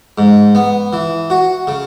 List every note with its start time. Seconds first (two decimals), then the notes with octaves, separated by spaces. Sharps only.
0.18 G#2
0.55 B3
0.93 E3
1.30 F#4
1.67 C#3